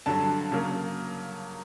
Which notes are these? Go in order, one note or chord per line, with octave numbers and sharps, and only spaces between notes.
G2 D3 F#3 A5
C#3 F#3 A#3